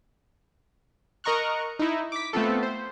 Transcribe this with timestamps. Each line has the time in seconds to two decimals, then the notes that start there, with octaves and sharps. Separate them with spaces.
1.24 A#4 D#5 A#5 C#6 F6 F#6
1.79 D#4 E4
2.12 D6 B6
2.33 A3 B3 C4 F4 A4
2.63 C5